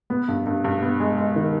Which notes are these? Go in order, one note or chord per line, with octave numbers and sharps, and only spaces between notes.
B3
G2
G2
G2
B3
G#3
G#3
D#3